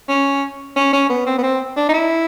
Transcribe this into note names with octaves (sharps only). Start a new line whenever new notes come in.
C#4
C#4
C#4
B3
C4
B3
C4
D4
D#4
E4